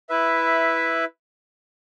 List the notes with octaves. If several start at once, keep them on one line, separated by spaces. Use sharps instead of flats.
E4 B4 E5